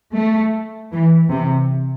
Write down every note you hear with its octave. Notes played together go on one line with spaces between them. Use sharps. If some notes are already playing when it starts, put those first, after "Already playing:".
A3
E3
C3